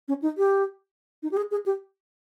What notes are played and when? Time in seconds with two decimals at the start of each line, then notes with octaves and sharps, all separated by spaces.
0.08 C#4
0.22 D#4
0.38 G4
1.23 D#4
1.32 G4
1.37 G#4
1.51 G#4
1.66 G4